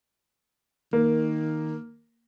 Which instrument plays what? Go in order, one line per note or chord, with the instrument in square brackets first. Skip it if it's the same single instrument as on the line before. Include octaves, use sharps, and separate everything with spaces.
[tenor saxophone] D#3 [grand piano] A#3